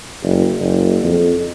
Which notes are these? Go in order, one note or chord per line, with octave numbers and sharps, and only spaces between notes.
F#1
F#1
F2